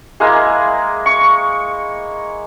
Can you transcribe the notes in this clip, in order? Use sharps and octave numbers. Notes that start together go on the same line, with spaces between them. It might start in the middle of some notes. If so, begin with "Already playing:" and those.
G#3 A#3 E4 G#4
C#6